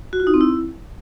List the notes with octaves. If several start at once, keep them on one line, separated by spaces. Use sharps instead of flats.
F#4
F4
D#4
C4
E4